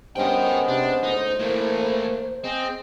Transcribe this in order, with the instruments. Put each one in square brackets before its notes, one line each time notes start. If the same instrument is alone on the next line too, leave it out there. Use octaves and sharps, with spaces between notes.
[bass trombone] G2 [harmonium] G#3 B3 C#4 [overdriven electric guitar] A#4 G5 [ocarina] C5
[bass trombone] C3 [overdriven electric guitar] D4
[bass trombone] D2 [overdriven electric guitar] D#4
[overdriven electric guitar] A2 E3 [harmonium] A3 [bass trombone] A#3
[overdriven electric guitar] C4 [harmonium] G#4 D#5